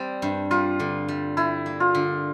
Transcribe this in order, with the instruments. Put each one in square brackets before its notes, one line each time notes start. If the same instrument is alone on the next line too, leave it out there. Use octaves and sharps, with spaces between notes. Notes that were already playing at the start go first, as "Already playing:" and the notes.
Already playing: [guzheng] G3 C4
G2
[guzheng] G3 [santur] F4
[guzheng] D3
G3
[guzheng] G3 [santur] E4
[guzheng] A#3
[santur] F4
[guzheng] D3